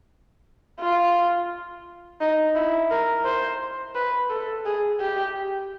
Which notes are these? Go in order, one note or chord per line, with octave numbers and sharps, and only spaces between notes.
F4
D#4
E4
A#4
C5
B4
A4
G#4
G4